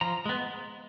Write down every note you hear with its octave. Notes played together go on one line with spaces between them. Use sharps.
F3 A#5
G#3 B3